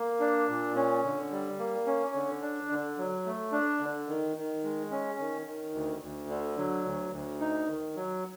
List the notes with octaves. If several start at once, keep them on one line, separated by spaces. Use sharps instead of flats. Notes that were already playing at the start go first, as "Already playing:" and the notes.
Already playing: A#3
D4
A#2
C#4
D3
G3
A#3
C#4
D3
D4
D3
F#3
A3
D4
D3
D#3
D#3
G#3
C#4
D#3
D#3
D2
D2
D3
F#3
D2
D2
D#4
D#3
F#3